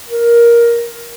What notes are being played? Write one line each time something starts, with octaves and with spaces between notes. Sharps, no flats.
A#4